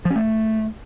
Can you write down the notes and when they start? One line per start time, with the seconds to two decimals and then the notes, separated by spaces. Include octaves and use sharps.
0.05 F3
0.10 C#4
0.16 A3